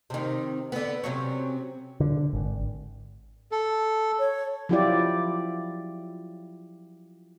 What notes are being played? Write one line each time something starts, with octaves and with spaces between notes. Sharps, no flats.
C3 D#3
D3 B3
C3 F#3 C#4
D3
G#1
A4
C#5
F3 F#3 E4 F4 G4 D5